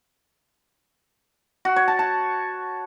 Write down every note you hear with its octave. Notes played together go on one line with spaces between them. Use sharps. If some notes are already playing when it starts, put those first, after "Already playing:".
F#4
C#5
A5
A5